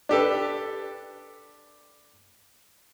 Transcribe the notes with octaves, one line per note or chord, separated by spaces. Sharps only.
D4 G4 A4 B4